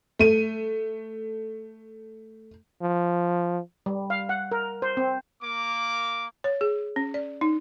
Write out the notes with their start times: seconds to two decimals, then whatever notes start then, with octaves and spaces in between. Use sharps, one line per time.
0.19 A3 D#7
2.82 F3
3.86 G3
4.10 F5
4.29 F#5
4.52 A#4
4.82 C5
4.97 C4
5.42 A#3 D6
6.44 C#5
6.61 G#4
6.96 C#4
7.14 D5
7.41 D#4